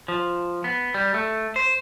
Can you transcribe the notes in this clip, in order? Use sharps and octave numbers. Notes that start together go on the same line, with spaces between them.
F3
B3
G3
A3
C5